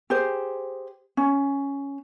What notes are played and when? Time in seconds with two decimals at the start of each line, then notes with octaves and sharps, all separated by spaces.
0.10 G4 G#4 C5
1.17 C#4